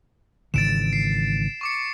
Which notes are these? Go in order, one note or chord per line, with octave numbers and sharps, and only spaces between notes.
G#1 C#3 E3 A6 D7 E7
C7
C#6 D6 C#7